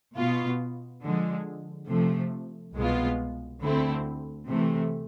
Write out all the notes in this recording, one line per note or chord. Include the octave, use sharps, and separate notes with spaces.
B2 B3 F4
D3 F3 G#3
C3 F3 A3
C2 B2 G#3 B3 F4
D2 D3 A3 C4 E4
C3 E3 A3